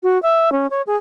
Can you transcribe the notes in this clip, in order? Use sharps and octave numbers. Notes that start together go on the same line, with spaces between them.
F#4
E5
C#4
C#5
G#4